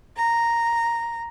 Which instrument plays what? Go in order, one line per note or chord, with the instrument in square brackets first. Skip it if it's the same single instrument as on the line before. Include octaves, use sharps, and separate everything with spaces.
[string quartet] A#5